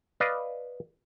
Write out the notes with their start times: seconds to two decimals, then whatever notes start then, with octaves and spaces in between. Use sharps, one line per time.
0.20 B4 D5 D#5 F5